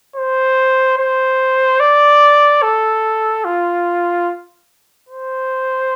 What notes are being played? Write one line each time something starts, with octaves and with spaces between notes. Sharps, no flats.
C5
C5
D5
A4
F4
C5